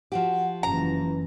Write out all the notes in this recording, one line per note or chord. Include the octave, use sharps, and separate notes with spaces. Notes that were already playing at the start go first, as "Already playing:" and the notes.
F3 F#4 G4 F#5
F#1 E3 C#4 A#5